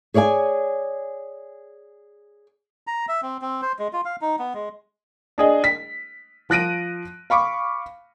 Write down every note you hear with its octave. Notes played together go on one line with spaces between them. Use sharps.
G#4 C#5 D5 E5 G#5
A#5
E5
C4
C4
C5
G#3
F4
F5
D#4
B3
G#3
D4 G#4 D#5
B6
F3 F#6 A#6 D7 D#7
F5 B5 C#6 D6